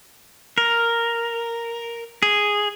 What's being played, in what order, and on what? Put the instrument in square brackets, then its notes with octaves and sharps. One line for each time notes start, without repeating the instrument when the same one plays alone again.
[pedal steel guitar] A#4
G#4